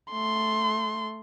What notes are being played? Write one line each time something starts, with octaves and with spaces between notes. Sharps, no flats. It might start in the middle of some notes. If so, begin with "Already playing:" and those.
A3 C6